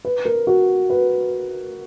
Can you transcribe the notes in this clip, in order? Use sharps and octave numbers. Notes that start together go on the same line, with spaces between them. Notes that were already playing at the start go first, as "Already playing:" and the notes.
B4
A#4
F#4
B4